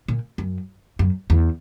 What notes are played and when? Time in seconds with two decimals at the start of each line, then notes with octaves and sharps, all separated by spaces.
0.08 A#2
0.38 F#2
0.99 F#2
1.30 E2